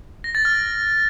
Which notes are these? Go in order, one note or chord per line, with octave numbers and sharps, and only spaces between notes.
A#6
A6
F6